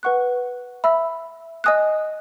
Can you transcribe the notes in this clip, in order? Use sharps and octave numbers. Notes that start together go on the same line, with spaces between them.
B4 F#5 C#6 F#6
E5 B5 E6
D#5 G#5 D#6 F#6